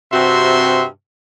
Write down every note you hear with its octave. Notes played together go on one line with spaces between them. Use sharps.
G2 C3 C4 F#4 E5 C6